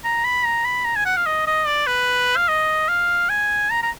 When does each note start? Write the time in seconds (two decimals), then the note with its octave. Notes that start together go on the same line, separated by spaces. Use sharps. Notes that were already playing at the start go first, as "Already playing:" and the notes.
0.04 A#5
0.25 B5
0.45 A#5
0.65 B5
0.85 A#5
0.96 G#5
1.05 F#5
1.17 F5
1.26 D#5
1.47 D#5
1.66 D5
1.87 B4
2.36 F5
2.48 D#5
2.89 F5
3.29 G#5
3.71 A#5
3.83 A#5